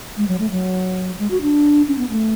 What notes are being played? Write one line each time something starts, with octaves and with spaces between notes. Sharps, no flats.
G#3
F#3
A3
F#3
G#3
F#4
D4
C#4
B3
A3